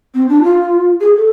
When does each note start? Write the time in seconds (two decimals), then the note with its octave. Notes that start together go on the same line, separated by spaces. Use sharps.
0.14 C4
0.29 D4
0.43 F4
1.01 G#4
1.15 A4